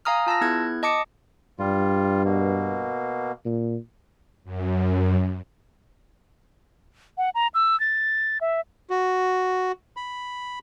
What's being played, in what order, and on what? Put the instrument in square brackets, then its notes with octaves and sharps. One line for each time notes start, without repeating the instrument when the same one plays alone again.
[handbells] F5 G#5 A#5 D#6 F6
F4 A5 E6 A#6
B3 E4 G#4 F#6 G#6
D#5 A5 D6 D#6 C#7
[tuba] G2 [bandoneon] G3 F4
[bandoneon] B2 A#3
[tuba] A#2
[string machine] F#2
[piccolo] F#5
A#5
E6
A6
E5
[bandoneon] F#4
B5